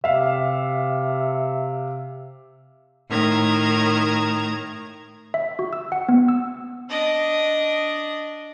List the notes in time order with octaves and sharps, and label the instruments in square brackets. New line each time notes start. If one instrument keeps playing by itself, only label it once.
[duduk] C3 [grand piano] E5 F5
[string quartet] A2 D#3 A#5 G#6
[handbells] E5
F#4
E6
F#5
B3
E6
[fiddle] D4 D#5